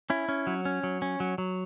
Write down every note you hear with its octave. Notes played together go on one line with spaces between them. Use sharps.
C#4 E4
C#4
F#3
C#4
F#3
C#4
F#3
F#3